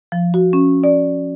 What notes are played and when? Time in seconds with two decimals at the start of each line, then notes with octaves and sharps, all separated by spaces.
0.12 F3
0.34 F#4
0.53 C#4
0.84 D5